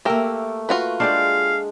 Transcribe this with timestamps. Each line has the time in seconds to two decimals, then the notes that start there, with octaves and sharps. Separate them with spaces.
0.05 A3 A#3 G4 A#4 E5
0.69 F4 F#4 B4
1.00 G#3 D4 G4 D5 F5